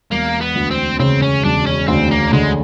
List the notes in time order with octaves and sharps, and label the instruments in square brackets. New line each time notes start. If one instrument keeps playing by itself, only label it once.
[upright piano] E1 [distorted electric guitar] A#3
[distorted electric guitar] B3
[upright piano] D2
[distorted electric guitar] C4
[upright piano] C#3 [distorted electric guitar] C4
[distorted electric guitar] C#4
[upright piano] E1 [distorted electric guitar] D4
[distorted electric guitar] C#4
[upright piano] D2 [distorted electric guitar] C4
[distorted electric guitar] A#3
[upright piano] D3 [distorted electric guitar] G#3